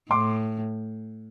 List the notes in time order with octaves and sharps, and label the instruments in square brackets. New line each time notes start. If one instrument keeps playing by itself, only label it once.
[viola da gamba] A2 [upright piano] C6 D6